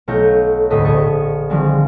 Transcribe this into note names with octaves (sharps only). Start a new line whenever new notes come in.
B1 A3 F4 C#5 G6 A#6
G#1 D2 A2 D#5 B6
A#1 D#5 C#6 A6
D3 D#3 F3 G3 G#3 C4